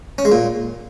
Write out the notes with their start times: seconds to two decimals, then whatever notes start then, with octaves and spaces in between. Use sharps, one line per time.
0.18 C#4
0.25 G#3
0.32 A#2